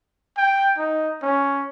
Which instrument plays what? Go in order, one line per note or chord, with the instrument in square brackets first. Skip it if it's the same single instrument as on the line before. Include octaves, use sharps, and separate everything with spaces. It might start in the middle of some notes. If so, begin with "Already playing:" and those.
[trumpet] G5
D#4
C#4